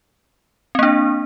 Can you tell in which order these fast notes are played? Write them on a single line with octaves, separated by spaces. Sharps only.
C4 A#3 D4